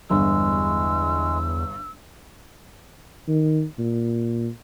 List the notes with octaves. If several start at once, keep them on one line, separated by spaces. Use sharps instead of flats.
G1 E2 G2 G#3 E6
D#3
A#2